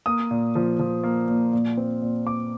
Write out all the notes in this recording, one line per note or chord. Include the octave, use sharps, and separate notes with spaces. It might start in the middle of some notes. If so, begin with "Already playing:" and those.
A#3 D#6
A#2
F3
F3
A#3
A#2
A#2
C4
A#2
A#2 D6